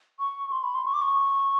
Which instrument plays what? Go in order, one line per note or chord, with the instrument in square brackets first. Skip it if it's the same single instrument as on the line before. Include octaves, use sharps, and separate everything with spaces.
[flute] C#6
C6
B5
C6
C#6
D6
C#6